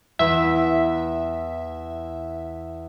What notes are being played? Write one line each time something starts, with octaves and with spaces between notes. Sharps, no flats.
E2 B4 E5